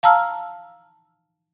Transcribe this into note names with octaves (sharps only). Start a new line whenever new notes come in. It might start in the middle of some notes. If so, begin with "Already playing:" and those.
F5 A5 A#5 E6 F6